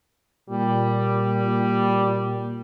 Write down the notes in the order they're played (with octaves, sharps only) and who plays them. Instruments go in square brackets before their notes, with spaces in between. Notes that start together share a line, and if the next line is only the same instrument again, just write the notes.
[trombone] A#2 [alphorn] G3